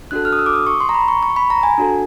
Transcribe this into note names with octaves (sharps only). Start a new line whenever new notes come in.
D4 F#4 A4 F#6
F6
D#6
E6
D6
D#6
C#6
C6
A#5
B5
C#6
C#6
B5
A#5
G#5
D4 F#4 A4